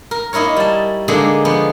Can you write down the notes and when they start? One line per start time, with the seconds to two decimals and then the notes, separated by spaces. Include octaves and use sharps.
0.11 A#4
0.33 A#3 D#4 E4 A#4 C#5
0.56 G3 A5
1.08 D3 G#3 A#3 D4 D#4
1.45 F3 B3